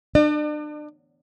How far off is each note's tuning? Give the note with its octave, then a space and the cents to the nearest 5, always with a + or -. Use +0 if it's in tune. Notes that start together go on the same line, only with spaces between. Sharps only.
D4 +35 D5 +45